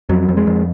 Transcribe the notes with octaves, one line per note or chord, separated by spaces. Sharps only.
F2 F#3
F2
G#3
F2